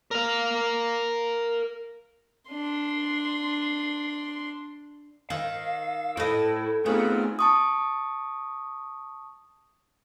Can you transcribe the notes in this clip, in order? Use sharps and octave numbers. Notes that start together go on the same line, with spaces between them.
A#4 F5
D4 C6
D#3 F5 E6
A2 E4 A4 D#5
A3 B3 C4 D#4 F4 G#4
A5 C#6 D#6